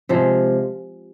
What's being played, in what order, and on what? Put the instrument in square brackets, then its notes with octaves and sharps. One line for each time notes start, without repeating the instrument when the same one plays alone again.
[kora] C3 F3 G#3